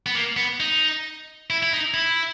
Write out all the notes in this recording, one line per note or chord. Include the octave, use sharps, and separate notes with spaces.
B3
A#3
B3
D#4
E4
E4
D#4
E4